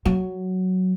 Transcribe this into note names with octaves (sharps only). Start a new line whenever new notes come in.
F#3